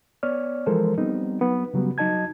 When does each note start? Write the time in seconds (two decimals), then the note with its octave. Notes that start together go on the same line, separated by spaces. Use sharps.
0.23 B3 C#5 D5 F6
0.66 E3 F3 G#3 A4 A#4 C5
0.98 G3 B3 C4 D#4
1.41 F#3 B3
1.74 C#3 F#3 G3 B3
1.98 F#3 D#4 D#5 A5 G#6